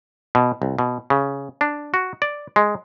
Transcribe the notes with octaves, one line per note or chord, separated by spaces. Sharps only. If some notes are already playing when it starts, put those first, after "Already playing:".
B2
C2
B2
C#3
D4
F#4
D5
G#3